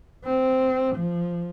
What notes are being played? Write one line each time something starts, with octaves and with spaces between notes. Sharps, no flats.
C4
F3